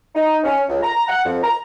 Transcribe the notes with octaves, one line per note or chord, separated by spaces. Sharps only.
D#4
C#4
C#2
A#5
F#5
F2
A#5